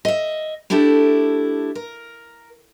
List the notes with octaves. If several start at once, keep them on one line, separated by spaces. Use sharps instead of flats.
D#5 E5
A3 D4 E4 G4 A4
A#4